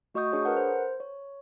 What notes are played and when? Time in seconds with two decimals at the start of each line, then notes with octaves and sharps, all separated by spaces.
0.14 A3 F#4 D#5 C#6 D#6 G6
0.33 D4 G#4 C#5
0.45 A#4 B4 F#5
0.57 C5
1.00 C#5